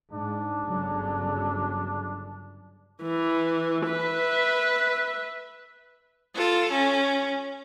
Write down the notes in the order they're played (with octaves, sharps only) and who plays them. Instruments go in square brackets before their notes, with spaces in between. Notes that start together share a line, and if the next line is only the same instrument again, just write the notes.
[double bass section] G#2 [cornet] D4
[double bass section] G1 C#3 F#3
[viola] E3
B4 E5
F4 A4
C#4